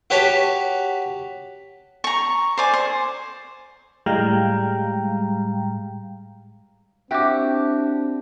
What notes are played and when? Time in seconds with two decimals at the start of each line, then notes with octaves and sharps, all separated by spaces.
0.10 F#4 G4 B4 C#5 A5
2.04 A#5 C#6
2.58 C5 D5 G#5
2.73 C5
4.06 A2 G3 G#3 F5 G5 A#5
7.11 C4 D4 E4 F#4 G4 G5 D6